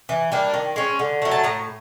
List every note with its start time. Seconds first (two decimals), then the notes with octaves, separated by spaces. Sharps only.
0.09 E3
0.32 G3 A#3 D4
0.54 D#3
0.76 G#3 C#4
0.99 D3
1.22 F#3 A3
1.31 A5
1.44 A2 A#5